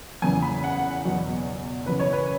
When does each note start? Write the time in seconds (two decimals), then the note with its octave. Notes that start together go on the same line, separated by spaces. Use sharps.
0.22 E2 C#3 E3 G#5
0.42 B5
0.64 F#5
1.04 E2 B2 F#3
1.86 F#2 C#3 E3 B4
2.00 C#5
2.13 B4